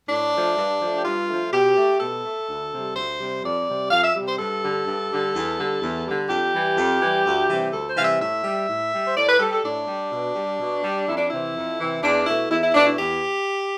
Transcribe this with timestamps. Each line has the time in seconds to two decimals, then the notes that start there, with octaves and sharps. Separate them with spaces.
0.09 A2 D4
0.34 F3 A3
0.57 G2
0.80 F3 A3
0.97 G4
1.05 G2 F4
1.29 F3 A3
1.52 B2 G4
1.76 A3
2.00 B2 A4
2.24 A3
2.48 D2
2.72 C3 G3
2.95 D2 C5
3.19 C3 G3
3.43 F2 D5
3.67 C3 G3
3.90 F2 F5
4.03 E5
4.15 C3 G3
4.26 C5
4.39 G2 A4
4.62 D3 G3
4.86 G2
5.10 D3 G3
5.35 E2
5.58 D3 G3
5.82 E2
6.06 D3 G3
6.29 F2 G4
6.53 E3 G3
6.77 F2
7.00 E3 G3
7.25 D2
7.49 C3 E3 G3
7.73 D2 A4
7.89 C5
7.97 C3 E3 G3 F5
8.04 E5
8.20 A2 E5
8.44 G3
8.68 A2
8.92 G3
9.04 C5
9.16 A2 D5
9.28 B4
9.39 G3 A4
9.51 A4
9.64 A2 D4
9.87 G3
10.11 B2
10.35 G3
10.59 B2
10.83 G3
11.07 F2 E4
11.17 D4
11.29 C3 E3 E4
11.55 F2
11.78 C3 E3
12.02 E2 D4
12.26 B2 A3 E4
12.50 E2 E4
12.62 E4
12.73 B2 A3 D4
12.86 E4
12.97 E2 G4